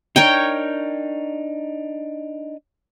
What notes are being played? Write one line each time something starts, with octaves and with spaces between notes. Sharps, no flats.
D4 D#4 A#4 C#5 G5